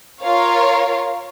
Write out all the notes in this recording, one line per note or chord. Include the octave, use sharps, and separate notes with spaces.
F4 A#4 C#5 F5